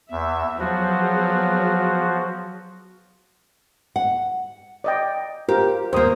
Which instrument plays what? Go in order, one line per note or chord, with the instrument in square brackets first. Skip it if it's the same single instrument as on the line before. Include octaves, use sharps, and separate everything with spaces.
[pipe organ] E2 [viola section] E5
[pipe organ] F3 F#4 [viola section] F#3 B3 G#4
[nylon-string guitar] F#5
[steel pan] D5 D#5 G5
[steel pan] F4 A#4 C5 [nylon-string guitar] G4
[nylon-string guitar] D#2 A#3 [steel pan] C5 D#6